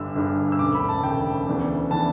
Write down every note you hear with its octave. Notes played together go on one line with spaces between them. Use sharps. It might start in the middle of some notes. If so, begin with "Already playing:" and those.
Already playing: G1 G2 D3 E6
G1 G2 D3
E6
E1 D2 C#3 D6
B5
A5
E1 D2 C#3 G5
D2 C#3 E3 B3 D4
C#3 E3 B3 D4 A5